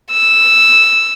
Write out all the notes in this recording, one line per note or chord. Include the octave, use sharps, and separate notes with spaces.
E6